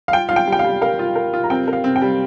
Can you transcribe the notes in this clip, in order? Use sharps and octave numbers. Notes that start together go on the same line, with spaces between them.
F5
F4 G5
F4 F5
G5
G3
G5
F5
G3
A#4 F5
F4
A#4
F4
A#5
C4 G5
A#4
F5
C4
G5
G3